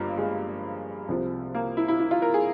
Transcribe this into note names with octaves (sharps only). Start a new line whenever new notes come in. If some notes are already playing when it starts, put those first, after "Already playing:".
Already playing: G1 G2 F3 G3 A#3
G#3
C2 C3 F3
A#3
E4
E4
E4
F4
A#4
G#4